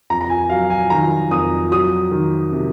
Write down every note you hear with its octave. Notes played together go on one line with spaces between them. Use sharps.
F2 A#5
A#5
G#5
F#3 F5
G#5
D#3 A#5
F2 D#6
F#3 D#6
D#3
C3